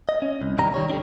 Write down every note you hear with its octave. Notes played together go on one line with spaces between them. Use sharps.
D#5
C#4
C2
C2 G2 D#3 G3 A#5
D#3 G3 C#5
D3 G3 D4